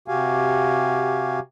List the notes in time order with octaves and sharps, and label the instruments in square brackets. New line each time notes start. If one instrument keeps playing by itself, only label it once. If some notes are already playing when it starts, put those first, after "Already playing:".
[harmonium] C3 F#4 G4 F5 G#5